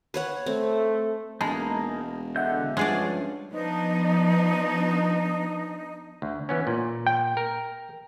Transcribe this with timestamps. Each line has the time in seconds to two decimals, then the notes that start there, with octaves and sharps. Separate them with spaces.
0.14 B4 C#5 F#5
0.46 A3 C4
1.41 E1 G#3 A#3 D#4 G#5 A5 B5
2.36 D3 D#5 E5 F#5 G6
2.77 G2 F3 G#3 C#4 G#4 D5
3.52 F3 B3 D4 D#4
6.22 D2
6.49 E3 B3 C#4
6.67 A#2
7.07 G5
7.37 A#4